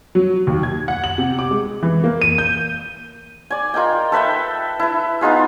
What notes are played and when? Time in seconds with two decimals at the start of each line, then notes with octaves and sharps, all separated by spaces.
0.15 F#3
0.47 D#2
0.63 G#6
0.88 F#5
1.04 F#7
1.18 C3
1.39 D6
1.51 G#3
1.82 E3
2.04 A#3
2.22 D#7
2.38 G6
3.50 D5 G#5
3.74 F4 A#4 D#5 G5
4.12 A4 B4 E5 G5
4.79 E4 B4
5.21 B3 D#4 F4 G#4